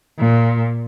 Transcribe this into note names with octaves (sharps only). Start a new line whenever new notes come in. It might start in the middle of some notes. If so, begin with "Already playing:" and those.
A#2